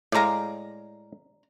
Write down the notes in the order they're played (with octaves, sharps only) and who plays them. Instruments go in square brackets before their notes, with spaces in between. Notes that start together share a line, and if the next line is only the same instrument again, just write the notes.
[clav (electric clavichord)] A2 G#3 F5 [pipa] D5 A#5